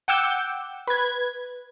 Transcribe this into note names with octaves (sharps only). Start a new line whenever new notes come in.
F#5 G5 D6 E6 G6 C#7
B4 G#6